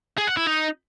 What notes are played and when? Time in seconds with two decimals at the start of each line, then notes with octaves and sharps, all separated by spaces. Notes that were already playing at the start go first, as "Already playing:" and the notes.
0.18 G#4
0.27 F#5
0.37 E4
0.46 D#4